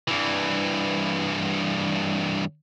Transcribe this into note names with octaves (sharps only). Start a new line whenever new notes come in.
G2 E3